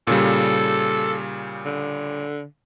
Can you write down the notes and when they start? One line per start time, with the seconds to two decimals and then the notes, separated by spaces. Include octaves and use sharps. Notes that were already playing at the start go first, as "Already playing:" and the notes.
0.07 A#2 C#3 G3 A4
1.65 D3